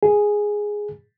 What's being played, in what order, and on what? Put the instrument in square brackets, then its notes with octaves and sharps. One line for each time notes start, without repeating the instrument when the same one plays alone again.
[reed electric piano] G#4